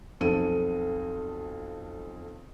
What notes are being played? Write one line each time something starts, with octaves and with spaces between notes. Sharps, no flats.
B1 F2 A4 D#7